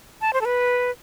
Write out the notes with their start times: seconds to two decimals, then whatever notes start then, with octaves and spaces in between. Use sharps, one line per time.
0.21 A5
0.33 C5
0.41 A4
0.45 B4